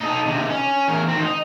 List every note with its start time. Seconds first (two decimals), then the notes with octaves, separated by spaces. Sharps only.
0.01 D#4 A4
0.26 C3 D#3
0.49 C#4
0.88 E2 A#4
1.08 D#3 C4
1.22 D#4